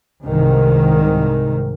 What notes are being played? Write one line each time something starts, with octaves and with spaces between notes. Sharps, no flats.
C2 G#2 D#3